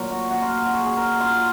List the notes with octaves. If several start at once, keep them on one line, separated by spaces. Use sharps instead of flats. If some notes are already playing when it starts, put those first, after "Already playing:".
Already playing: A#2 F#3
F#4
F#4
F4
F#4
G#4
G#4
A#4
F4